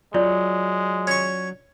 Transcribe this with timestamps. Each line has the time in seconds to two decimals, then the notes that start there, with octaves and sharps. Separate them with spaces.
0.14 F#3 G#3 F4 D5
1.07 C#4 C#6